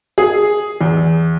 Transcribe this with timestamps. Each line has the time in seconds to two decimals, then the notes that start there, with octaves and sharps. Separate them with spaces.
0.18 G#4
0.81 E2